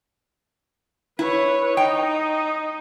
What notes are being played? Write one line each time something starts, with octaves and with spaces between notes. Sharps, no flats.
E4 B4 C#5
D#4 G5